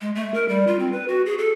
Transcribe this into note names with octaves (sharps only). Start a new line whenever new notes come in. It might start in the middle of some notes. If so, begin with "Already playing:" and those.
G#3
A3
A#4
G3
F4
C4
B4
F#4
G#4
A4